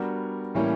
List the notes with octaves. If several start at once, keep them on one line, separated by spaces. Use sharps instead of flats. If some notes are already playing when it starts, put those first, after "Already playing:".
Already playing: G3 B3 D4 F#4 A#4
A2 E3 G3 A#3 C#4